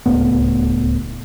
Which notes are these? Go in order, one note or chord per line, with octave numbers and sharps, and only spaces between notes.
D1 C#2 A2 B3